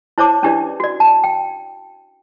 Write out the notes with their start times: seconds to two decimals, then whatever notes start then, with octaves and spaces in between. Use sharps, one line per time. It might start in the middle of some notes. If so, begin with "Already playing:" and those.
0.18 E4 C5 C#5 A5 D6
0.43 C#4 D4 E4 G4 B4 D5
0.80 F#4 D5
1.00 A5
1.24 G5